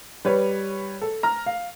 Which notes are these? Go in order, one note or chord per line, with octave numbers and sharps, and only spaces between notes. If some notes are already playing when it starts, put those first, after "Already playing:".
G3 B4 C#5
A4
A#5 F6
F5